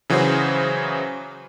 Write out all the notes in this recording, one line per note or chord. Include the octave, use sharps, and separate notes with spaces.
C#3 E3 F#3 F#4 G#4 C5